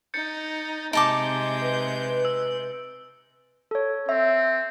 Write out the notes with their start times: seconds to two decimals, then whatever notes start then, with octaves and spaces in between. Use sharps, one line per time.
0.14 D#4 G6 A6 C#7
0.93 C3 G#3 D#4 A5 D6 G6 D7 G7
1.61 B4
2.25 E6
3.71 A4 C#5
4.09 C4 E5